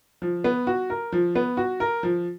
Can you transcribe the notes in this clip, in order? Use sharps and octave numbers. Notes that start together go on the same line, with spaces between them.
F3
B3
F#4
A#4
F3
B3
F#4
A#4
F3